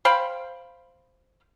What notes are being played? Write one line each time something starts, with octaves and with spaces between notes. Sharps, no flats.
C5 F5 G5 B5